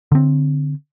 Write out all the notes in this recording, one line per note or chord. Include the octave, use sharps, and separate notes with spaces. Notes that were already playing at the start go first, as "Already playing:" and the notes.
D3 C4